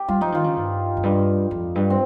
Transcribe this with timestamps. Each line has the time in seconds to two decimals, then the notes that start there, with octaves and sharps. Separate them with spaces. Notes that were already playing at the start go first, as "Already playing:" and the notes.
Already playing: G4
0.08 G3 F4
0.21 F3 D#4
0.32 D#3 F4
0.44 C#3
0.57 G2
0.97 F2
1.03 G2
1.51 F2
1.75 G2
1.90 C4